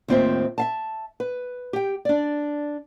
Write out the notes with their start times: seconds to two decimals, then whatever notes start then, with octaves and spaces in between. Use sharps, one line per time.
0.08 D#2 A2 C4 F4 C5 E5
0.58 E5 F5 A5
1.20 B4
1.73 G4 G5
2.05 D4 D5